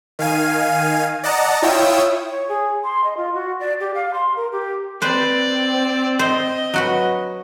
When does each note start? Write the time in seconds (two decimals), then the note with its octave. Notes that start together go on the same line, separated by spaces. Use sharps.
0.19 D#3 F5 G#5 D#7
1.23 D5 D#5 F#5 A5 A#5
1.62 E4 F4 C#5 G5 D#6 E6
2.30 C#5
2.49 G#4
2.84 C6
3.04 D#5
3.17 F4
3.34 F#4
3.60 D5
3.80 G4
3.94 F5
4.14 C6
4.36 A#4
4.52 G4
5.02 C4 B4 C5 D5
6.19 C5 D#5
6.74 F#3 F#4 B4